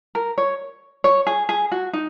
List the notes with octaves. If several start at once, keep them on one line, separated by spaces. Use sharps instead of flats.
A#4
C#5
C#5
G#4
G#4
F#4
D#4